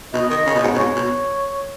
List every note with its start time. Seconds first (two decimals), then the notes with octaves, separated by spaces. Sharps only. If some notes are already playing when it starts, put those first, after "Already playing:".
0.13 B2 D#5
0.30 D#3
0.46 C#3
0.55 B2
0.63 G#2 C#5
0.74 B2
0.79 G#2
0.96 B2